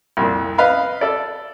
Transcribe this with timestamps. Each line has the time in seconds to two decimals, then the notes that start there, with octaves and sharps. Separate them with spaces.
0.17 C2 F2 A#2
0.58 B4 D#5 F5 B5
1.01 A4 D5